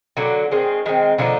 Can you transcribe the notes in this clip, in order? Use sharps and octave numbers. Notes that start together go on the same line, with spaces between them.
D3 F#3 A#3
D#3 G#3 C4
D#3 G#3 C4
D3 F3 A#3 D#4